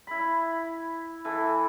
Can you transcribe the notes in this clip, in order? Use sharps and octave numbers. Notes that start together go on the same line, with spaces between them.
E4 B5
E3 A4 B4